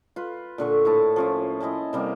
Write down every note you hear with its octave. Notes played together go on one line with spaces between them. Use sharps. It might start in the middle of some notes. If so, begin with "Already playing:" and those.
F4 B4
A#2 D3 C#6
A2 E4 A5
F3 C#4 E4
E4 D#5 G#5 A5
C3 G3 A#3